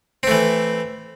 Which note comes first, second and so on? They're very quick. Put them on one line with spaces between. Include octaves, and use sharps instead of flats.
C4 A3 E3